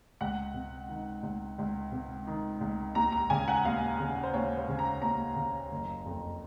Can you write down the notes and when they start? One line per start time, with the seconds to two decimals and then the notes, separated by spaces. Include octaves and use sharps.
0.21 C#2 F#5
0.54 C3
0.89 D#3
1.23 C#2
1.58 C#2
1.92 C3
2.27 D#3
2.61 C#2
2.95 D#2 A#5
3.12 A#5
3.30 C#3 G#5
3.48 F#5
3.65 D#2 F5
3.99 C#3
4.23 C5
4.34 D#2 C#5
4.57 C5
4.68 C#3
4.79 A#5
5.02 D#2 A#5
5.36 C#3
5.72 F#1
6.06 F2